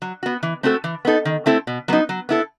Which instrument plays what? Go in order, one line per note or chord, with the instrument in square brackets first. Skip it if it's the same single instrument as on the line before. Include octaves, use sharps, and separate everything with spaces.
[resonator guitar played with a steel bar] F#3
B3 F#4
E3
A3 C4 F#4 A4
E3
B3 D#4 A4
D#3
A3 C4 E4 A4
B2
F#3 B3 D#4
F#3
B3 E4 A4